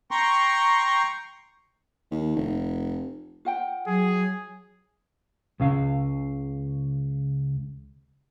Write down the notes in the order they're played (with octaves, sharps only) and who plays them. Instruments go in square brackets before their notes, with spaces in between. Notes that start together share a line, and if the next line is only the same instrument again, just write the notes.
[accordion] G5 A#5 C6 C#6
[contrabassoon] D#2
F1
[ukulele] F4 F#5 G5
[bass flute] F#3 [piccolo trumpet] G#4
[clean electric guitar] C#2 C#3 F5